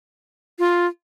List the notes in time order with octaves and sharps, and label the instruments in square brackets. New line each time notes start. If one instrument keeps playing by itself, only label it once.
[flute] F4